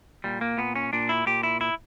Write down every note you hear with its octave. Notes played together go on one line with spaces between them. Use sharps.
A#2 G3
A#3
A#2 B3
C#4
A#2 D4
E4
A#2 G4
E4
E4